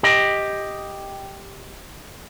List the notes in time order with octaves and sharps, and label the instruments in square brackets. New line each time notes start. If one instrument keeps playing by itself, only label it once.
[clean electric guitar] G4 D#5